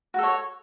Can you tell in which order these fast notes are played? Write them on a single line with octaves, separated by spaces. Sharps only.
F#4 A4 C#5